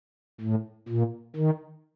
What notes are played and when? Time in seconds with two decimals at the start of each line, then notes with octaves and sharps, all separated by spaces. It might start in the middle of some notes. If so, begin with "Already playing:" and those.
0.41 A2
0.88 A#2
1.36 D#3